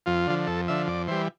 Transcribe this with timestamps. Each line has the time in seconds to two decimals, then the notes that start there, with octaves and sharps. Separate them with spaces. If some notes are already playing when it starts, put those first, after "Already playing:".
0.06 F2 F4
0.27 D3 F3
0.47 F2 A4
0.68 D3 F3 E5
0.87 F2 D5
1.08 E3 G3 C5